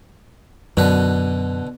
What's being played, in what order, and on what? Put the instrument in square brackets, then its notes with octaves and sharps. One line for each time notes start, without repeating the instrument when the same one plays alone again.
[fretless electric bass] F#2 [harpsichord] B2 D3 B4